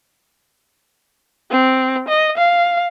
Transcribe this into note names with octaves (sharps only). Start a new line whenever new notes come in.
C4
D#5
F5